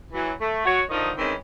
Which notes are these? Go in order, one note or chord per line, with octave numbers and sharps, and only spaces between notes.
E3 F#3
A3
F#3 F#4 C#5
D3 D#3 F3 D#4
D#3 E3 G#3 C4 C#4